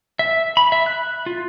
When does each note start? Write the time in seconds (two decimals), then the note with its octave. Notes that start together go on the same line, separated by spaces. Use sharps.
0.19 E5
0.57 B5
0.72 E5
0.86 F#6
1.26 F4